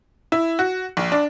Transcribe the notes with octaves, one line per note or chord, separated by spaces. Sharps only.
E4
F#4
A#1
D4